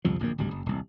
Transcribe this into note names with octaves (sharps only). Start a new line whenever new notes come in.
G1 C2 F2 F3
D1 A#1 F#2 A#3
D1 G#1 D2 G3
F#1
D#1 C2